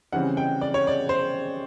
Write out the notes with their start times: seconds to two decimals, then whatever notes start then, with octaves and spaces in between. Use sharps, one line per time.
0.13 C#3 E3 G3 C4 F#5
0.37 G5
0.61 D5
0.74 C#5
0.87 D5
1.09 C5